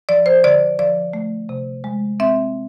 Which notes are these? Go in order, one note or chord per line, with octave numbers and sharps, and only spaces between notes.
F3 D5
C5
D3 D5
F3 D5
A3
C3
G#3
C4 E5